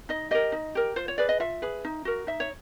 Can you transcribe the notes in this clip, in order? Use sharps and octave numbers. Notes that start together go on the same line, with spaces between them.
D#4 D#5
G4 A#4 D#5
D#4
G4 A#4
F4 C5
C#5
G#4 B4 D5
D#5
F4 E5
G#4 B4
D#4
F#4 A#4
D#4 E5
C#5